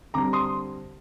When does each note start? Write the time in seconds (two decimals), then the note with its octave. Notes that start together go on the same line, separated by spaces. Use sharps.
0.14 D3 G3 C4 A#5 D6
0.33 C6 D#6